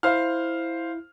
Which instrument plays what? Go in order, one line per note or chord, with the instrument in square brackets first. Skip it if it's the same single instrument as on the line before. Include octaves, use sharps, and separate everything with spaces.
[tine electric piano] E4 [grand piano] C5 F5 F6